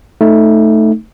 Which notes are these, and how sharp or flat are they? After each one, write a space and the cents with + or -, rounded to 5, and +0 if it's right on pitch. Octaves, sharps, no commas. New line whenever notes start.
A3 +0 D#4 +0